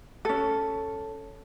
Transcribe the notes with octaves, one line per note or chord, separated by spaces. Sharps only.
C#4 A4